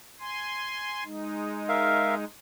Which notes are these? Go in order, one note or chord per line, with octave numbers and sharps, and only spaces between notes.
G#5 C6
G#3 D#4
A#4 E5 F5